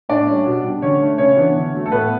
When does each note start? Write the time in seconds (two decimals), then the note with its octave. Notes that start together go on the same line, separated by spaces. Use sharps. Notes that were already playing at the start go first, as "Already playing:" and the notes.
0.09 A2 D4 D5
0.27 G3 C#4
0.46 B2
0.64 G3 D4
0.82 D3 C#4 C#5
1.01 A3 D4
1.18 C#3 C#4 C#5
1.37 E3 B3 D4
1.56 D3
1.74 F#3 A3
1.86 A4
1.92 A2 B3 B4